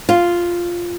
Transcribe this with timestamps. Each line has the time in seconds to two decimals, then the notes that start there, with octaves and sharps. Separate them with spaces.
0.09 F4